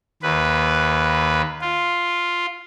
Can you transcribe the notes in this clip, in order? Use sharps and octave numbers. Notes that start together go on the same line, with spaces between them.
D#2 B4
F4